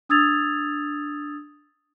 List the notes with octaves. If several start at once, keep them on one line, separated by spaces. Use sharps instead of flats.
D4 D#6 E6 G#6 A6 F7